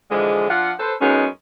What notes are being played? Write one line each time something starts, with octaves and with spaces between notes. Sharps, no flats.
D3 E3 F3 G#3
F3 D4 F4 F#5
A4 B4 C5
F#2 G#3 B3 C#4 D#4